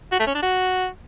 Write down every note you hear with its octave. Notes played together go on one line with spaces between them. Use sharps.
F#4
A3
C#4
D4
F#4